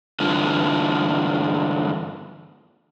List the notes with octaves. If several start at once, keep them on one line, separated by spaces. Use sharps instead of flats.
G2 D3 E3 F4